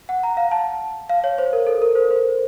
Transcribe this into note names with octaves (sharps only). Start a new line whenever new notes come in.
F#5
A#5
F5
A5
F5
C#5
C5
A#4
A4
A#4
C5
C5